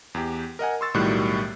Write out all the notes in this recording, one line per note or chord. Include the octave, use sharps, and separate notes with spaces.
E2 G4
A#4 D#5 F#5 G#5
C6 C#6 E6 A6
B1 A2 D#3 G3 F#4 F#6